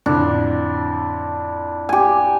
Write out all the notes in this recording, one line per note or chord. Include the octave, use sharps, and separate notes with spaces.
F2 A2 D3 D4
G4 G#5